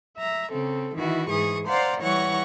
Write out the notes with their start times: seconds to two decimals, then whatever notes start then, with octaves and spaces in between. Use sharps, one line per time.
0.17 E5 A#5
0.50 C#3 C4 A4
0.94 D#3 E3 E4 F#4
1.30 G#2 E3 G#4 C#6 D#6
1.66 C5 D5 F5 F#5 A#5 C6
2.02 E3 G3 C#5 F#5 C#6 A#6